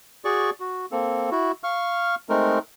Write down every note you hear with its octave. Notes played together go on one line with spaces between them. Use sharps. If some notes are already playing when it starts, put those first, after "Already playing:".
F#4 G#4 D5 C#6
F#4
A#3 C4 A4
E4 F#4
F5 C#6 F6
G#3 A3 C4 D#4 A#4